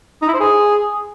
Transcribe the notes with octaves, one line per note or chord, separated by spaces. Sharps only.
D#4
E4
C5
G#4